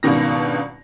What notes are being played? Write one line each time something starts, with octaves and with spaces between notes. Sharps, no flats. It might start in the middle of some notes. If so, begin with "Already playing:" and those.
G#1 C#2 G2 B2 D#3 A#6